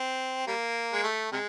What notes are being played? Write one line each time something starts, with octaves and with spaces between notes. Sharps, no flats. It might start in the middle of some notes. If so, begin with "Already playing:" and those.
Already playing: C4
G3 A#3
G#3
A3
C3 G#3